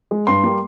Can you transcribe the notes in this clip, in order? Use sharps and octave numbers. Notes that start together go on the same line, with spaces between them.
G#3
G2 C6
G3 A#3